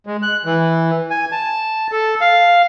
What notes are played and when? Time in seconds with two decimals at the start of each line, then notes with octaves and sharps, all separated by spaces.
0.07 G#3
0.22 F#6
0.45 E3
1.11 G#5
1.32 A5
1.92 A4
2.21 F5